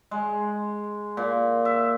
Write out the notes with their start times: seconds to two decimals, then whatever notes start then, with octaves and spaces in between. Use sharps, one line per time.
0.11 G#3
1.17 A#2
1.65 E5